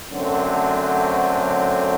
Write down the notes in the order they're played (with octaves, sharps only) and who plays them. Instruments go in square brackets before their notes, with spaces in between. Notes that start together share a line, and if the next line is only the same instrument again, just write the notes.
[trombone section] F#2 D3 F#3 A3 C4